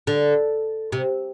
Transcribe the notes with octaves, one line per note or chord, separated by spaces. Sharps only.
D3
C3